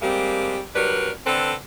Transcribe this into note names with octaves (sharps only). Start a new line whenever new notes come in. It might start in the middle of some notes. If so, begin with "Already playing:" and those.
G3 G#3 A#3 C4 G4
F#3 G3 D4 A#4 B4
D3 C4 A4 B4